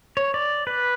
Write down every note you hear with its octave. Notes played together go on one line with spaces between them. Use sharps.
C#5
D5
B4